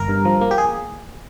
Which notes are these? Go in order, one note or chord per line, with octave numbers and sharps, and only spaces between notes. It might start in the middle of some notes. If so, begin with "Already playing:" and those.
Already playing: G1 A#4
G2
F3
A#3
G4
G#4